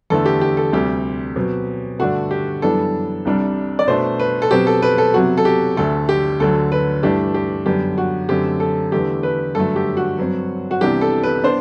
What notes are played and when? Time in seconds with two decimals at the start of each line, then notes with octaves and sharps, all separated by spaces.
0.10 E2 D3 A3 A4
0.26 G4
0.41 G4
0.57 A4
0.73 D2 C3 G3 G4
1.36 B2 F#3 C4
1.99 G2 D3 A3 D4 F#4
2.31 G4
2.62 F#2 E3 G3 B3 D4 A4
3.25 C2 C3 G3 D4
3.79 D5
3.87 B2 A3 D4 C5
4.20 B4
4.42 A4
4.51 B2 F#3 C4 G4
4.67 A4
4.82 B4
4.98 A4
5.14 C3 F#3 B3 F#4
5.38 A4
5.45 G4
5.77 D2 D3 A3 A4
6.09 G4
6.40 D2 D3 F#3 A4
6.72 B4
7.03 G2 E3 A3 D4 G4
7.34 G4
7.66 F#2 D3 G3 B3 D4 G4
7.98 F#4
8.29 F#2 D3 A3 C4 G4
8.60 A4
8.92 E2 D3 A3 G4
9.23 B4
9.55 G2 D3 F#3 A3 A4
9.76 G4
9.97 F#4
10.18 G2 F#3 C4
10.71 F#4
10.81 C2 C3 E3 B3 D4 G4
11.01 A4
11.23 B4
11.44 B3 D4 C5